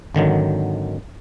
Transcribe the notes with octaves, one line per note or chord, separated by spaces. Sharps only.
G#1 D3 D#3 F#3